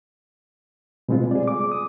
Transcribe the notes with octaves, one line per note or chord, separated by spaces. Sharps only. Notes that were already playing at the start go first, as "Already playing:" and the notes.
B2 G3 G#3 C4 F4
G#4 D5
D6
D#6